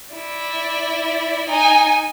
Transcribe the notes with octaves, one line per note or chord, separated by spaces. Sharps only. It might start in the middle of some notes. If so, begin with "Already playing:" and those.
E4 D5
D#4 G#5